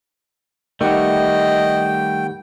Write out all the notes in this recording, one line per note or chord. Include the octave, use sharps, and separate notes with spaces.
D#3 G3 A3 G4 D#5 F#5 G5